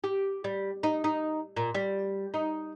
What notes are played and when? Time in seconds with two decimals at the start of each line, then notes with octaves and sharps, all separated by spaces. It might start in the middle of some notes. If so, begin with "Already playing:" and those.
0.04 G4
0.44 G3
0.83 D#4
1.04 D#4
1.57 A#2
1.75 G3
2.34 D#4